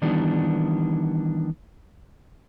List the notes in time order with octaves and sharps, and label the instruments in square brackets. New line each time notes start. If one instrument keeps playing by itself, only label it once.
[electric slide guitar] D#3 E3 G3 B3 D4